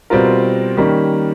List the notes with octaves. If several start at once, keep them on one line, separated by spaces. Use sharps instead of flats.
B2 G3 C4 F4 A#4
D#3 G3 A#3 C#4